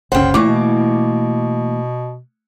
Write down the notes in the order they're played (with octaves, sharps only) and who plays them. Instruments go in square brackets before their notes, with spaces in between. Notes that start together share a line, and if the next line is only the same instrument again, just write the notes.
[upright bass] F#1 C2 [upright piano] C#3 C5 [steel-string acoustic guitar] F#5 G5
[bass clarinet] A#2 [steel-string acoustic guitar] E3 A#3 [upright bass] A3 [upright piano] C#6 D6
[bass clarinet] B2